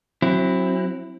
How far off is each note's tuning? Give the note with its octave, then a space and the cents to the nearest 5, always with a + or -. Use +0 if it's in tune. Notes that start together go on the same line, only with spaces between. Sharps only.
F#3 +0 C4 +25 E4 +10